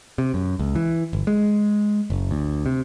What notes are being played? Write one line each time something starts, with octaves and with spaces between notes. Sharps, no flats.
C3
F#2
C#2
E3
G1
G#3
F#1
D2
C3